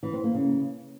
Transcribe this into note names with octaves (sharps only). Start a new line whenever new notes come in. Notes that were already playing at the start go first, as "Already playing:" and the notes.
E3
C4
A#3
C#3